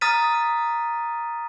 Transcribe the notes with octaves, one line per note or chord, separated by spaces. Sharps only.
A#5 D#6 F6 A6 B6 D#7